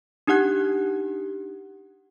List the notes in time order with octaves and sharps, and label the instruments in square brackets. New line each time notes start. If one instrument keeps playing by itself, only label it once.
[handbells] D4 D#4 G4 F#5 F#6